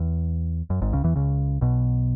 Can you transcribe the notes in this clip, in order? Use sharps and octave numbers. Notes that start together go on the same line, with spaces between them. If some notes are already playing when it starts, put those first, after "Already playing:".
Already playing: E2
F#2
G#1 G#2
C#2 C#3
E2 E3
C#2 C#3
B1 B2